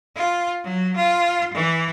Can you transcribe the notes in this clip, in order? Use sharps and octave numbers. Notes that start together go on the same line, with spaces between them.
F4
F#3
F4
E3